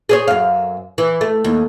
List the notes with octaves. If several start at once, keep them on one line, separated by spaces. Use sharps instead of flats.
G#4 C5 C#5
F#2 F5
E3
A3
D#2